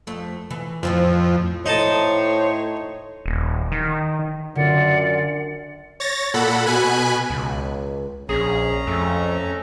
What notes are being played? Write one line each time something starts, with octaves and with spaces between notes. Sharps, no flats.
F2 A3
E3
F2 A2 F3 C5
A2 D#4 C5 C#5 A5
D#1
D#3
F#2 D3 F4 D5 F#5
C#5 A6 A#6
A#2 A4 F#5 B5
B2 G#5 B5 F#6
C#2
A#1 C#4 G#4 A#5
F2 A3